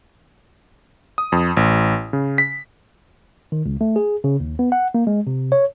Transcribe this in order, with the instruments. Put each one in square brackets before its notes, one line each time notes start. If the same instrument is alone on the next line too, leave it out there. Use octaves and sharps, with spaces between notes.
[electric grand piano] D#6
F2
A1
C#3
B6
[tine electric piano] D#3
C#2
A3
G#4
C#3
D#2
B3
F#5
A#3
G#3
C3
C#5